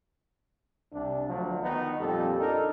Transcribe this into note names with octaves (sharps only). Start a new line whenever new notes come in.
C2 D4
D2 F3 F#3
D#3 B3 D#4
F2 A#2 G3 A4
D4 D#4 A4 A#4